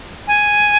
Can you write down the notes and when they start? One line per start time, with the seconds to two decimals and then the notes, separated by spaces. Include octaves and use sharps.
0.27 G#5